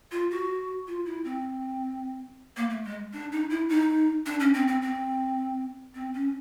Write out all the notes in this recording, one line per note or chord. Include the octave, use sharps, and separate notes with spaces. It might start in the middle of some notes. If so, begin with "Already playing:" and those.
F4
F#4
F4
E4
C4
A#3
A3
G#3
D4
D#4
E4
D#4
D4
C#4
C4
C4
C4
C4
C#4